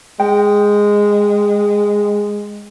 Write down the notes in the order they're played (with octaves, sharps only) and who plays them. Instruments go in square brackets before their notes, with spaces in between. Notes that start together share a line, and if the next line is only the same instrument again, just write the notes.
[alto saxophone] G#3 [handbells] G5